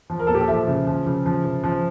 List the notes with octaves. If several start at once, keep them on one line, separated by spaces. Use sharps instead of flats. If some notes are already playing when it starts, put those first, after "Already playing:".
F3
A#4
A#2 A4
G4
A4
F3 E5
C#3
F3
C#3
F3
C#3
F3